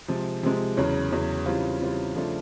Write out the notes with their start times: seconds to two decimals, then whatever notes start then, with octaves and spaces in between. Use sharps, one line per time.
0.08 C3 F3 G#3
0.43 C3 F3 G#3
0.77 E2 C#3 F#3
1.12 E2 C#3 F#3
1.46 C#3 E3 G3 C4 F4
1.80 C#3 E3 G3 C4 F4
2.15 C#3 F3 A3 D4 F4